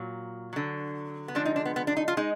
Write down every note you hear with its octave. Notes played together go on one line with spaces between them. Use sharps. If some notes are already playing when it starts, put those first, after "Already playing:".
Already playing: A#2 F#3
D3 F#3
B3
D3 F3 G#3 D4
D#4
D4
B3
B3
D4
D#4
F4
G#3 D#4